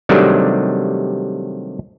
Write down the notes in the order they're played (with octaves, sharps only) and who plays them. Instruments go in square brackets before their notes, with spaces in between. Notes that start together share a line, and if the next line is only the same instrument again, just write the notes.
[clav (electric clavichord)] C3 D#3 F#3 G3 A3 D4